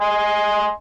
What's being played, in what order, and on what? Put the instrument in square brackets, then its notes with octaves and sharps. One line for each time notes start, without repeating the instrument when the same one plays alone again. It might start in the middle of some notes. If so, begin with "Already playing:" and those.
[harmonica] D#5 G#5 C6